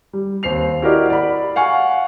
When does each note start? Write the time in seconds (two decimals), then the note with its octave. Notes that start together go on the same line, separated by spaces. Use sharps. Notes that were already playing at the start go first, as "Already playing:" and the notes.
0.13 G3
0.43 D#2 C4 C7 F7
0.82 E4 F#4 G4 A#4 D5 D#5
1.10 D5 B5
1.56 F5 F#5 G#5 C#6